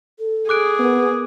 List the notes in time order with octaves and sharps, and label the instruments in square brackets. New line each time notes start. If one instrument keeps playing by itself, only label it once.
[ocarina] A4
[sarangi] G#4 [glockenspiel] D6 F#6 D7
[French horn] B3 [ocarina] A#4